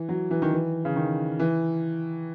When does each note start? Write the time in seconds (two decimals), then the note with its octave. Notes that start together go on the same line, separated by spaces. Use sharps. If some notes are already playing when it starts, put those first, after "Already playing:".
Already playing: E3
0.09 F#3
0.31 E3
0.42 D#3
0.52 E3
0.85 C#3
0.96 D#3
1.39 E3